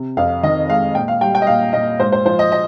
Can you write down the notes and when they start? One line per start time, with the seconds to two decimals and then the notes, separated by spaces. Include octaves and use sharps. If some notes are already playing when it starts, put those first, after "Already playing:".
Already playing: C3
0.17 F2 F5
0.43 D#3 D#5
0.69 G#3 F5
0.95 A#2 G5
1.08 F5
1.21 G3 G5
1.35 G5
1.42 D#5
1.47 A#2 F5
1.73 A#2 D#5
2.00 G#2 C5
2.12 C5
2.25 F3 C5
2.39 D#5
2.52 D#5